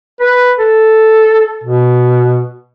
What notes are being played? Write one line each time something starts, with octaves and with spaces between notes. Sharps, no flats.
B4
A4
B2